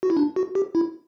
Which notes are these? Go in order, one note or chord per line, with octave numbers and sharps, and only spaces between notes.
F#4
E4
D4
F#4
G4
E4